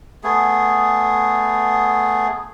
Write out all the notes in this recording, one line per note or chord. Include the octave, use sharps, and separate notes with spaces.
A3 B3 G#4